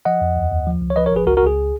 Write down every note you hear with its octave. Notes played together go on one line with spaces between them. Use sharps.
F3 D#5 F#5
F2
D#2
D#2
F3
C#2
C#5
F3 B4 D#5
A#4 C#5
G#1 G#4 B4
C#2 F#4 A#4
F#4 A#4
C#2
G#4